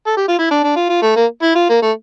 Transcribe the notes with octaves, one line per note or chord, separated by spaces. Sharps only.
A4
G4
F4
E4
D4
D4
F4
F4
A3
A#3
E4
F4
A#3
A3